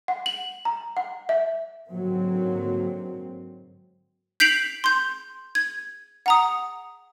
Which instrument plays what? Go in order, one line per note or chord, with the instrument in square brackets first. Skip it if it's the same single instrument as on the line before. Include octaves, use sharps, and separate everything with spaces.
[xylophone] F#5
F#7
A#5
F#5
E5
[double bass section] G#2 D3 F#3 A#3 C4
[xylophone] G6 B6 C7 D7 F7 F#7
C6 G6
G#6
F#5 A#5 D#6